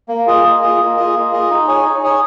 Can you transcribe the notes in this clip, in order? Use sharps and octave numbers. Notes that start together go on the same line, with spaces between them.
A#3
F4 G#4 D#5
A#3
F4 G#4 D#5
A#3
F4 G#4 D#5
A#3
F4 G#4 D#5
D#4
G#4 C#5 G#5
D#4
G#4 C#5 G#5